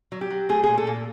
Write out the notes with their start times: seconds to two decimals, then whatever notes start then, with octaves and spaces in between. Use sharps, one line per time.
0.12 F#3
0.21 G4
0.30 F#3
0.49 A3 G#4
0.64 A#2 G#4
0.78 A4
0.87 A#2